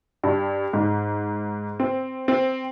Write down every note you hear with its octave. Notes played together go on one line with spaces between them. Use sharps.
G2
G#2
C4
C4